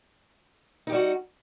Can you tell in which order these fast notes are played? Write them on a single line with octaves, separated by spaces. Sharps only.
D#4 G4 G3 F#4